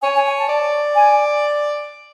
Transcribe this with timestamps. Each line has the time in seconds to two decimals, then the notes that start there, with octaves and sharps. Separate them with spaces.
0.03 C#5 G#5
0.15 G#5
0.26 G#5
0.38 A5
0.49 D5
0.95 G#5